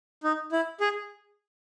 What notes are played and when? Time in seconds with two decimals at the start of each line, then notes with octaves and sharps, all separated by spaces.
0.24 D#4
0.52 E4
0.80 G#4